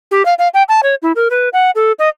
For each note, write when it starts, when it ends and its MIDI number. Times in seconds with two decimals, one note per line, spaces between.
0.11 0.25 67
0.25 0.34 77
0.39 0.48 77
0.54 0.63 79
0.69 0.81 81
0.83 0.95 73
1.02 1.12 64
1.16 1.28 70
1.30 1.49 71
1.53 1.71 78
1.75 1.92 69
1.99 2.09 75